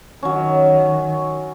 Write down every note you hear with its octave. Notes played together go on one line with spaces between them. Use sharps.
D#3 F#3 C#4